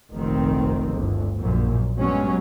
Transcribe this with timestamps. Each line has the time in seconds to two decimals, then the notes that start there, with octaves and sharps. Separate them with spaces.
0.13 F1 A#1 D#3 C4
0.94 G1 D2
1.39 A#1 F#2 A#2
1.97 G2 B2 F#3 G#3 C#4